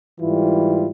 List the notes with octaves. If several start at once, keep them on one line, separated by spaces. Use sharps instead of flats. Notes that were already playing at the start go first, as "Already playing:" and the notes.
G#2 E3 G3 E4 F4